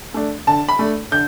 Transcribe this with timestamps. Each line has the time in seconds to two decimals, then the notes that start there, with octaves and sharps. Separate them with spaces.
0.14 A3 D4
0.47 D3 A5
0.69 B5
0.79 A3 D4
1.11 D3 G6